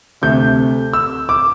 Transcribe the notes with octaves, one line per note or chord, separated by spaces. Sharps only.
D2 C3 A3 G6
E6
D6